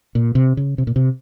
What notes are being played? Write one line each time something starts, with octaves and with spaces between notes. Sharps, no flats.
A#2
C3
C#3
C3
A#2
C3